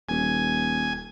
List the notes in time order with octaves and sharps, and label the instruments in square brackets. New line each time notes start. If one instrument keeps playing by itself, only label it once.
[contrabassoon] D#1 [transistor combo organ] G#5